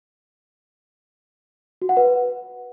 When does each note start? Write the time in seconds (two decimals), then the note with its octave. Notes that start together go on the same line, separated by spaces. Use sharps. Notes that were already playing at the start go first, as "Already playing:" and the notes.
1.82 F#4
1.89 F#5
1.97 B4